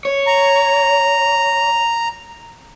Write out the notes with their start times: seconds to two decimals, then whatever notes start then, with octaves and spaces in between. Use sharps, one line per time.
0.05 C#5
0.27 A#5